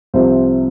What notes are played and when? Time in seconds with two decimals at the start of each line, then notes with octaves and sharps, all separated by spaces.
0.14 C2 C3 F3 C5